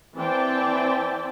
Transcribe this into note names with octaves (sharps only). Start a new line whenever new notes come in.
E3 C4 D5 E5 G5 A5